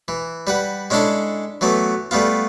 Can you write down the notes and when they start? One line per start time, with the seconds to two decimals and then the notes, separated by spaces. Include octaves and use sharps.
0.08 E3
0.47 G3 B4 F#5
0.90 G#3 C#4 D4 E4 A4
1.61 E3 F#3 A3 B3
2.11 G3 A3 B3 F4